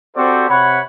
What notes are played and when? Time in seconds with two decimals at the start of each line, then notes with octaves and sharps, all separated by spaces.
0.16 C4 F#4 G4 A4 C5 D5
0.49 C3 C#5 F#5 B5